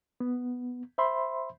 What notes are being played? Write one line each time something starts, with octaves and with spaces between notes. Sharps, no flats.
B3
C5 E5 B5 C6